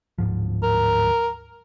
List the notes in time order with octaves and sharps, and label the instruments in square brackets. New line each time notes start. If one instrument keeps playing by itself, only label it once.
[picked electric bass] D1 G#2 F3
[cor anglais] A#4